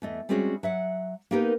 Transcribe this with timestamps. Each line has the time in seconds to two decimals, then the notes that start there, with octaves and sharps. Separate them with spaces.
0.02 E2 A3 D#5
0.29 G3 G#3 C4 C#4 F#4 G#4
0.63 F#3 E5 F#5
1.31 A#3 B3 D#4 G4 A#4 B4